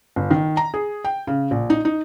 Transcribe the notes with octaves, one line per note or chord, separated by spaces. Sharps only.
G1
D#3
A#5
G#4
G5
C#3
A#1
D#4
D#4